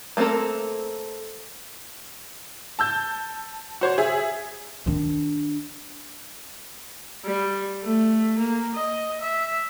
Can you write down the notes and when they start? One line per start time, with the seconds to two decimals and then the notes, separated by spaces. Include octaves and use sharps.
0.17 A3 A#3 C4 A4 A#4
2.79 A5 E6 G6
3.81 F#4 C5 C#5
3.98 G#4 E5
4.86 D#3 D4
7.25 G3
7.84 A3
8.38 A#3
8.75 D#5
9.21 E5